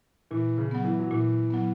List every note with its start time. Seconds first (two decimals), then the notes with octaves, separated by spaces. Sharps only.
0.31 A#2 E3
0.58 C#3
0.71 F#3 B3
0.84 E3
0.99 F#3
1.11 A#2 E3
1.50 F#3 B3